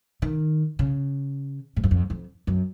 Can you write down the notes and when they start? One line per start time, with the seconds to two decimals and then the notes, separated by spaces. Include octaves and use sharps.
0.22 D#3
0.79 C#3
1.76 G#2
1.84 F#2
1.91 F2
2.10 F2
2.47 F#2